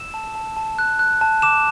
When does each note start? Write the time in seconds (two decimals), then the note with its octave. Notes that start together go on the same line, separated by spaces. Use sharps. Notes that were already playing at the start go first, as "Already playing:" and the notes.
Already playing: E6 E7
0.14 A5
0.35 A5
0.57 A5
0.79 F#6
0.99 F#6
1.21 A5
1.42 D6 E7